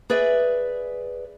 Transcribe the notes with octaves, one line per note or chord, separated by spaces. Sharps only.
G#4 B4 D5 E5